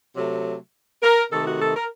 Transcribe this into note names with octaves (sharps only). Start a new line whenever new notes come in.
C3 F#3 A3
A#4
C3 D#3 A3 A4
F#4
A4
A#4